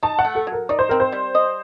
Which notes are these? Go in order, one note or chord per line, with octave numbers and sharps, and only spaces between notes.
D#4 A5
F#5
A3
A4
F#3
A#4
D#4 D5
C5
C4 A#4
C5
G3
D#5